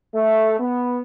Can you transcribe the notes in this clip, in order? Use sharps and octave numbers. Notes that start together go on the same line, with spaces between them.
A3
B3